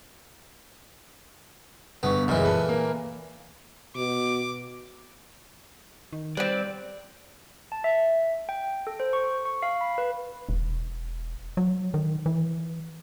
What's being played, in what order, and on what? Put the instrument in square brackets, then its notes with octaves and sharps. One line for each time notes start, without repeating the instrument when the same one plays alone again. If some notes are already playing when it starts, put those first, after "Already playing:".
[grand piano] G1 C#6 [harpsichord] B3
[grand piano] F#1 C#2 G#3 [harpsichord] A#2 E3
[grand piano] A4 B4
A#3
[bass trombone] B2 [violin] D6
[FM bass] D#3
[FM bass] G3 [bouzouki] C4 B4 [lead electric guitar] D5
[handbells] A5
E5
G5
A4
C5
C#6
C#6
F5
B5
B4
[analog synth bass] E1
F#3
D#3
E3